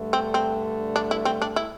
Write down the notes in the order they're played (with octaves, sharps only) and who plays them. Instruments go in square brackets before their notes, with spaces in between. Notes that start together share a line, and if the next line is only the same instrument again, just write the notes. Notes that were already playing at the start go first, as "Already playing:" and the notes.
Already playing: [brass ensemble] G2 D3 A3
[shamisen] C4
C4
D4
E4
C4
D4
E4